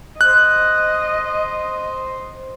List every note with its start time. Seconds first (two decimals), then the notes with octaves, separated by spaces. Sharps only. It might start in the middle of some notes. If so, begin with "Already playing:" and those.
0.21 C5 D#5 F#6